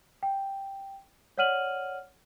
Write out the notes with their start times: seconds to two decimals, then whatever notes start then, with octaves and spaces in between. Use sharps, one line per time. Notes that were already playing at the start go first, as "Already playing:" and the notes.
0.23 G5
1.38 C#5 D5 F#5 F6 D#7 F#7